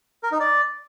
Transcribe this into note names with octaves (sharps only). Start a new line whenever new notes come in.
A#4
D#4
D5